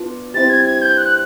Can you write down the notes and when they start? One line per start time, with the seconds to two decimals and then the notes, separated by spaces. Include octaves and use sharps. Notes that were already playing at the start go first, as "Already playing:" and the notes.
Already playing: B3 D4 F4
0.34 G3 C4 E4 A6
0.50 G#6
0.66 G#6
0.82 G6
0.98 F#6